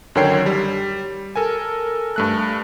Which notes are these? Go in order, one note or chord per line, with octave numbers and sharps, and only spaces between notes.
F#2 D3 D#3 C#5 G5 C7
G3
A4 A#4 G#5
G2 A3 F#6